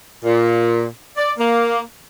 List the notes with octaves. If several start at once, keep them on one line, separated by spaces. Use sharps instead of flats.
A#2
D5
A#3